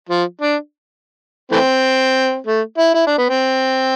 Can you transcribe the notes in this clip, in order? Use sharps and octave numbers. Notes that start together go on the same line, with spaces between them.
F3
D4
E3 A3 C4
A3
E4
E4
D4
B3
C4